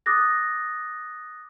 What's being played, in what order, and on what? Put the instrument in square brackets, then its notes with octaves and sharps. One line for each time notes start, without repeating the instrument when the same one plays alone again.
[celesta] D6 D#6 F#6 A6 A#6